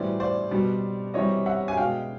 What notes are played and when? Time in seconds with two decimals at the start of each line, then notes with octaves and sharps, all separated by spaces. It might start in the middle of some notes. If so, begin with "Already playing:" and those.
Already playing: A2 E3 G3 C5 D5
0.20 C5 D5
0.51 B2 G3
1.14 C3 E3 G3 C#5 D#5
1.46 E5 F#5
1.68 G#5
1.77 B2 G#3 F5 G5